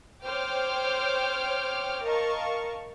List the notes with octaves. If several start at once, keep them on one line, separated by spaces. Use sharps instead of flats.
C5 C#5 G5 D6 F6
A#4 D#5 F5 A5 C#6